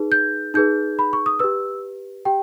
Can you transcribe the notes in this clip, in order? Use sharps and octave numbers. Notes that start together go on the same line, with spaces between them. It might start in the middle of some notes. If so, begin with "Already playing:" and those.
Already playing: D#4 G#4 B4
G6
D#4 G#4 B4 G6
B5
C#6
D#6
G4 B4 E6
G4 G5